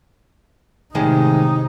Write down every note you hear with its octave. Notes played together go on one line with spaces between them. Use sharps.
A2 C3 D#3 G#3 D#4